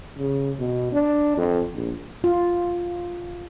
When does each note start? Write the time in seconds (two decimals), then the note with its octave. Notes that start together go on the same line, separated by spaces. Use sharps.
0.19 C#3
0.59 B2
0.93 D4
1.37 F2
1.74 A#1
2.24 F4